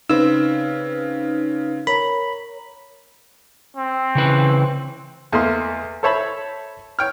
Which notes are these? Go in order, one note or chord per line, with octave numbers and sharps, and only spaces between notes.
C#3 C4 D#4 B4 E6
A#4 C#5 A#5 B5
C4
C#3 E3 B4
E2 A3 A#3 D#5 C6
A4 C5 C#5 E5 A5 B5
C#5 G5 F6